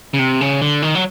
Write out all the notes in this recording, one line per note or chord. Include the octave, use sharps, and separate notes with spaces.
C#3
C3
C#3
D3
D#3
F#3